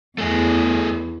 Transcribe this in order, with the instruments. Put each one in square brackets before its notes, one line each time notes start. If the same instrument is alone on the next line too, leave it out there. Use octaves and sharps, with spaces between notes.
[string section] E2 [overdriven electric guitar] A3 G#4